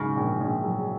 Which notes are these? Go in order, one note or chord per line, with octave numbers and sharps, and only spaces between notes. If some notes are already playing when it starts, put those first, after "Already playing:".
Already playing: G#2 C#3 F#3
A#1
A#1
F#3